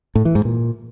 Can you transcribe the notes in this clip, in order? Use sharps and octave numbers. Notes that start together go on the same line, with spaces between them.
A2
E3
G#2
A#2